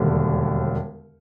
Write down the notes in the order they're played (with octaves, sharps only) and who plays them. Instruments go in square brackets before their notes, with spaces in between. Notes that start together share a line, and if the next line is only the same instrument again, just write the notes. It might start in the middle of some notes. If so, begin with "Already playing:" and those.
Already playing: [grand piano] E1 D#2 D3 G3